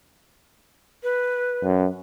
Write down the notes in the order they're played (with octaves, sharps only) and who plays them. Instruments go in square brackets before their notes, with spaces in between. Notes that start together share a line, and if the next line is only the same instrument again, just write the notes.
[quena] B4
[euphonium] F#2